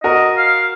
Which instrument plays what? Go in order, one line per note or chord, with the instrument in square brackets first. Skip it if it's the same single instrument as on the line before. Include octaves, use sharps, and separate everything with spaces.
[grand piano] F#4 A#4 [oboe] D#5
[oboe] F5